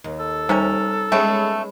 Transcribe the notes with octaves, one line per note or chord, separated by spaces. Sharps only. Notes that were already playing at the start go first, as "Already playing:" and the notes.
D#2
A4
C3 G3 C#4 D#4 A#4
G#3 A3 B3 C#4 G5 B5